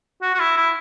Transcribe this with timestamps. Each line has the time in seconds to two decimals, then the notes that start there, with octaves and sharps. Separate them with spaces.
0.22 F#4
0.34 F#4
0.39 E4
0.57 E4